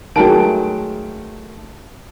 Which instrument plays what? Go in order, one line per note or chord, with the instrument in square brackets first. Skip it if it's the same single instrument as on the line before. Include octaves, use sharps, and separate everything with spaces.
[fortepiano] D#3 F#3 G#3 [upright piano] A3 A5 D7